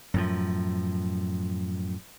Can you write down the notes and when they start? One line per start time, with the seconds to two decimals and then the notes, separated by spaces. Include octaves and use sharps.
0.14 F#2 A2 F3